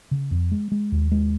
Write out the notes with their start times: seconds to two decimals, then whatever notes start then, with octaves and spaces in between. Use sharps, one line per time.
0.11 C#3
0.31 F2
0.52 G#3
0.72 G#3
0.92 D#2
1.12 G#3